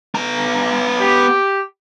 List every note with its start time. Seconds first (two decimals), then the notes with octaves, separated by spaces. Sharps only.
0.15 B3 A#5
1.00 G4